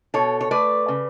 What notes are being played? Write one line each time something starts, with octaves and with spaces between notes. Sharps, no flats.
B2 A4 C#5
C#5
A3 B4 D5
C#3